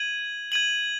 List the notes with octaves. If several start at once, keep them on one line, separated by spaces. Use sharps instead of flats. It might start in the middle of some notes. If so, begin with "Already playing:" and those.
Already playing: G#6 D#7 F#7
G#6 D#7 F#7